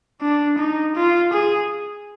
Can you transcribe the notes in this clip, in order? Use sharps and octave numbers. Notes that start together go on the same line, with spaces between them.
D4
D#4
F4
G#4